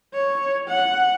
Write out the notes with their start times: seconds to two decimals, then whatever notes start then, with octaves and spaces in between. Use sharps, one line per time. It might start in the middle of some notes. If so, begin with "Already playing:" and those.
0.14 C#5
0.68 F#5